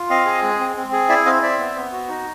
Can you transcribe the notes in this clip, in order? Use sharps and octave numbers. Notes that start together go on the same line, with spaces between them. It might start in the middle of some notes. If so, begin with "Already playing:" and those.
Already playing: F4
C4 D#5 F5
G#4
G#3
C4
C4
G#4
E4 D5 E5
C4 D#5 F5
C4 D5 E5
B3
B3
F#4
D#4